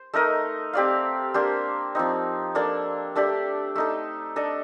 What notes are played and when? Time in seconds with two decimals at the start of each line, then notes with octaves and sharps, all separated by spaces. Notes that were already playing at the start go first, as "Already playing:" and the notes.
Already playing: C5
0.14 A3 D#4 A#4 D#5
0.73 C4 G4 D5 F5
1.34 A#3 D4 G4 C5
1.95 F3 C4 D#4
2.55 A#3 D4 A4 D5
3.15 A3 D4 G4 D5
3.75 A3 D#4 A4
4.36 D4 A4 D#5